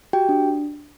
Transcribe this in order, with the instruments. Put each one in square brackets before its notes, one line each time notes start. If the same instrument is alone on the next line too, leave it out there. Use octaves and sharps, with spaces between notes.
[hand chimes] F#4 G4 G5
D4